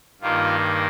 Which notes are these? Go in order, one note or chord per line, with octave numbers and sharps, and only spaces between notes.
G2 D#3 A#3 F4